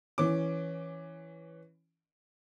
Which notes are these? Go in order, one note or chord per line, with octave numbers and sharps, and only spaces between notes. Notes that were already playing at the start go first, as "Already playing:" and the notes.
E3 C#4 D6